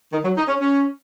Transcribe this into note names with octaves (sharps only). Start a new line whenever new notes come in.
D#3
F#3
D#4
C#4
C#4